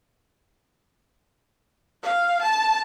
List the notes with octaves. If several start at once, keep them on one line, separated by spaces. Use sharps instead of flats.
F5
A5